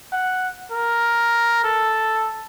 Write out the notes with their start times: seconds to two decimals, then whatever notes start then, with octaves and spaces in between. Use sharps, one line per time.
0.12 F#5
0.71 A#4
1.64 A4